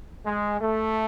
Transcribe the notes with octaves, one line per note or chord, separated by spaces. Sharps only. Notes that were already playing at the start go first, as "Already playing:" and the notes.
G#3
A3